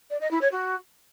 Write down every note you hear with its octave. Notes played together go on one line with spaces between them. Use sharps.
D5
D#5
E4
C#5
F#4